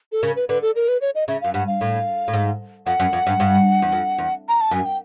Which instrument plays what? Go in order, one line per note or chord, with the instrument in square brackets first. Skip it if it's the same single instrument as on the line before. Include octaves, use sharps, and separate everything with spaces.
[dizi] A4
[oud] C#3 [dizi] A#4
[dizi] B4
[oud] D3 [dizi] B4
[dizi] A4
A#4
B4
C#5
D#5
[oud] C#3 [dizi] E5
[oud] F#2 [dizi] F5
[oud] G2 [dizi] F#5
[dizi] F5
[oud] A2
A2
G#2
[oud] F2 [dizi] F#5
[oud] F#2
F2
G2
G2
E2
F2
E2
[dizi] A#5
A5
[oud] F#2 [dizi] G#5
[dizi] G5